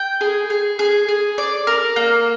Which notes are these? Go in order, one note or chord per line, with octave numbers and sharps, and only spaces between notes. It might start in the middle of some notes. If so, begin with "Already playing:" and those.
Already playing: G5
G#4
G#4
G#4
G#4
D5
A#4
A#3